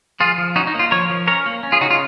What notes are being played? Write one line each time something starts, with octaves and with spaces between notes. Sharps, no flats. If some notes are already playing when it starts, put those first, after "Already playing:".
F3 F4 G#4
F3
C#4 D#4 F#4
D#4
A#3
F4
F3 A#4 C#5
F3
C#4 A#4 C#5
A#3
C#4
F4 G#4
C#3 D#4 F#4
F4